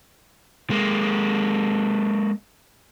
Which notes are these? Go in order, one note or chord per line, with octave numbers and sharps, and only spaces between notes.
G#3 A#3